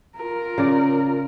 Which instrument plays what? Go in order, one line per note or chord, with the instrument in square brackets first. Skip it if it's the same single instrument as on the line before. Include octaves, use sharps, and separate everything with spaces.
[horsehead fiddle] F4 A#4
[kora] C#3 D5